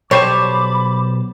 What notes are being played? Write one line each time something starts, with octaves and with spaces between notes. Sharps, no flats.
B1 G3 C5 C#5 A5 B5 D6